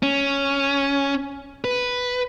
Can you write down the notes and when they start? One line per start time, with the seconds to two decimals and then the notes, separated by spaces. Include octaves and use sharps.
0.03 C#4
1.64 B4